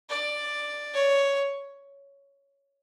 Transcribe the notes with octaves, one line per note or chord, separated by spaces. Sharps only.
D5
C#5